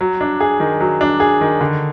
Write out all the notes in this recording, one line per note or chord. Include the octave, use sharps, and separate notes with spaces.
F#3
D4
G#4
D#3
F#3
D4
G#4
D#3
D3